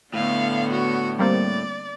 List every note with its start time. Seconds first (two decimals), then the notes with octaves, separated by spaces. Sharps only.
0.14 A2 D3 B3 F5
0.71 F#4
1.19 G3 A#3 C4 D5